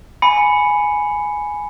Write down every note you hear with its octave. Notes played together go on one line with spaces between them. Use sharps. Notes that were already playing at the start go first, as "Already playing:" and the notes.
G#5 B5 C#7